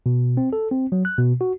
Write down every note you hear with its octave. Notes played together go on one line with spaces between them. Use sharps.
B2
C4
A4
C4
F#3
F#6
B2
F#4